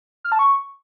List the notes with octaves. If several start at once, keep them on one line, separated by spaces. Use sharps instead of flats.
F6
A5
C#6